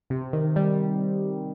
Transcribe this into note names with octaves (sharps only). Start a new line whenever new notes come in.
C3
D#3
G3